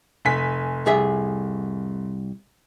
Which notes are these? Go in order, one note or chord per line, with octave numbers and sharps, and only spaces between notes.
F1 G#5 B6
C2 G#4 E5